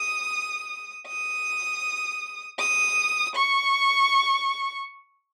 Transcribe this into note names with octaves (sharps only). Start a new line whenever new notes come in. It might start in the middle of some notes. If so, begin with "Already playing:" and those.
Already playing: D#6
D#6
D#6
C#6